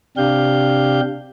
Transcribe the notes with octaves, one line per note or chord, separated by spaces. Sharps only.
C3 D4 G4 F5 G6